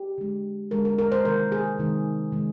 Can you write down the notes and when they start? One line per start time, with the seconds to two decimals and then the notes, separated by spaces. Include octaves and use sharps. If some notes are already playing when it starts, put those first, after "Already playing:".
Already playing: G4
0.18 D3 G#3
0.71 D3 G#3 A#4
0.85 A#4
0.98 A#4
1.12 C5
1.25 C3 D#3 G#3 A#4
1.52 G#4
1.78 C3 D#3 G#3
2.32 C3 D#3 G#3